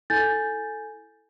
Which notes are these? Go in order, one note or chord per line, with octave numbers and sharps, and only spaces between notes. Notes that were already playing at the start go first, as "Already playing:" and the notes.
E4 A4 G#5 G6 A6